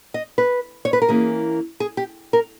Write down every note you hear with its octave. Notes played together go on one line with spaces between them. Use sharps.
D#5
B4
C#5
B4
A#4
E3 A#3 C#4 G#4
G#4
G4
A#4